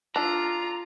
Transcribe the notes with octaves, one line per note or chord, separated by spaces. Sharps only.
D4 F4 A4 A#5